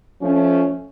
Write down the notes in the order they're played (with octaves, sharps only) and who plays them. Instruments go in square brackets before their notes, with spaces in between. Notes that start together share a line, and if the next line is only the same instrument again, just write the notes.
[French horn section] F3 A3 C#4